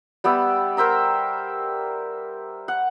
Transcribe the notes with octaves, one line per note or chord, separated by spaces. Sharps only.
G3 B3 G4 E5
A#4 C5 E5 A#5
F#5